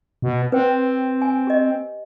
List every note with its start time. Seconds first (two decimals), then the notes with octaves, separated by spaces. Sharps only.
0.22 B2
0.52 C4 B4 C5 G5
1.22 G#5
1.47 G4 D#5